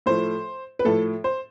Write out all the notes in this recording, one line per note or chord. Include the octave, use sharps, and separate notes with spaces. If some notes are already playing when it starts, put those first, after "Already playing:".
A2 F3 A3 C5
B4
A2 F3 A3 A4
C5